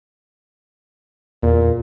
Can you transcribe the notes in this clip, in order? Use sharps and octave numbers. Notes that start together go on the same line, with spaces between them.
E2 A#2